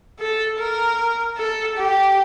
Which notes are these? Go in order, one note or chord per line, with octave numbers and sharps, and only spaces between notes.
A4
A#4
A4
G4